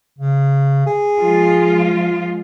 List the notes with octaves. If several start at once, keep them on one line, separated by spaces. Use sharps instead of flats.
C#3
G#4
F3 G#3 F4